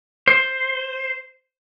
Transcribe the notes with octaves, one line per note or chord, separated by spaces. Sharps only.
C5